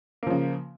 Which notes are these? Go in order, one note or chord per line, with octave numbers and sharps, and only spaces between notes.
C#3 F3 A#3